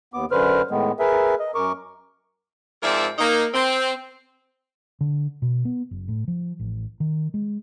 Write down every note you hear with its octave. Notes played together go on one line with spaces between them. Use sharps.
D#2 B3 D6
F#2 D3 B4 C5 F6
A2 D#3 G#3 B3
G#4 A#4 B4 E5
D#5
F#2 A#4 C#6 D6
G#2 F3 C4 A#4 D5 E5
A#3 D#4
C4
D3
B2
B3
F#1
A2
F3
A1
D#3
G#3